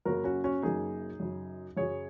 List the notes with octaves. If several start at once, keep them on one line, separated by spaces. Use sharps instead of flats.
F#2 C#3 F#3 A#3 F#4 A#4
C#4 F#4
C#4 F#4
F#2 C#3 F#3 A#3 D#4 G#4
F#2 C#3 F#3
F#2 C#3 F#3 G#4 C#5